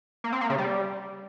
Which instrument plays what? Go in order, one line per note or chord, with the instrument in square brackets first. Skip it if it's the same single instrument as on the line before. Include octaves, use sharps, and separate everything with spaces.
[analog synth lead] A#3
C4
A#3
C#3
G3